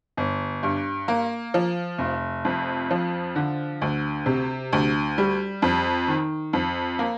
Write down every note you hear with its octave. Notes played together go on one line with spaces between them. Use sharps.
G1
G2
A#3
F3
F1
F2
F3
D3
D2
C3
D2
G3
F2
D#3
F2
A#3